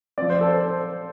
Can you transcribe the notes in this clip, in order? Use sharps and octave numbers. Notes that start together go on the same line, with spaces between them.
F3 C4 D5
C5
A4
C5